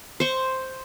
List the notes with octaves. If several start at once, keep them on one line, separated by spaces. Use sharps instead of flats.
C5 C#6